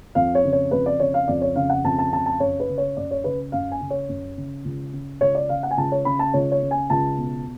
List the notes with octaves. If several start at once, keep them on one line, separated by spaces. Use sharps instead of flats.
F2 F5
C#5
C#3
C#5
F2 B4
D5
C#3 C#5
F5
F2 D5
C#5
C#3 F5
F#5
F2 A5
A5
C#3 A5
A5
F#2 C#5
B4
C#3
C#5
F#2 D5
C#5
C#3 B4
F#2 F5
G#5
C#3
C#5
F#2
C#3
C#2
C#3
C#2 C#5
D5
C#3 F5
F#5
G#5
C#2 A5
C#5
C#3 B5
A5
C#2 C#5
C#5
C#3
G#5
C#2 A5
B2